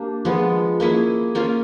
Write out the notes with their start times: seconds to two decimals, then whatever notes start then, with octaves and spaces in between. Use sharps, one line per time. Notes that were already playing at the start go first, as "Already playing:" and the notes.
Already playing: A#3 D4 G4
0.25 F3 G#3 B3
0.80 A#3 C#4 E4 G#4
1.35 A#3 C#4 F4